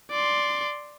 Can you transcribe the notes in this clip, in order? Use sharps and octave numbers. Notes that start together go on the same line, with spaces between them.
D5 C6